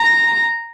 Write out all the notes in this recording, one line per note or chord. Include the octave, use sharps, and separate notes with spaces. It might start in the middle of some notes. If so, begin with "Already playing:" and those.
Already playing: A#5